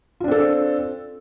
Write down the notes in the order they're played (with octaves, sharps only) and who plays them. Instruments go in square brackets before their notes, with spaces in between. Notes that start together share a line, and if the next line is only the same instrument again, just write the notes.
[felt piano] F4
D4
C4
A4